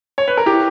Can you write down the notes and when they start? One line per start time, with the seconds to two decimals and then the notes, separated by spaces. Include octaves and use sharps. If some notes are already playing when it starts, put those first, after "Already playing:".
0.18 C#5
0.28 B4
0.37 A#4
0.46 E4 G4